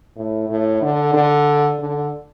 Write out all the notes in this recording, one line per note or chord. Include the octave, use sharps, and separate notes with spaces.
A2
A2
D3
D3
D3